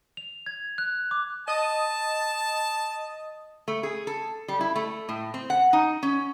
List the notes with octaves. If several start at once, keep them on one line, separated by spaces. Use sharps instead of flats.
F7
G#6
F#6
D6
D#5 A5 D#6
A3
G#4
A4
G3
E4
A3
A2
C4
F#5
D#4
C#4